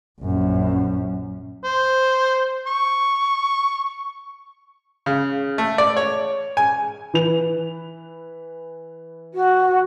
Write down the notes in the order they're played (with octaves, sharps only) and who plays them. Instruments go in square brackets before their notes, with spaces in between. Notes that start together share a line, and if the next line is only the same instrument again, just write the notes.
[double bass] A#1 F#2
[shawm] C5
C#6
[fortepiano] C#3
A3
D5
C#5
G#5
[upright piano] E3 B4 F7
[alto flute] F#4